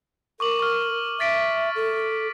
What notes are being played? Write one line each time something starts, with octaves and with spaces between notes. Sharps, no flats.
A#4 C#6 D6 F#7
C#6 F6
E5 A6 B6 D7
A4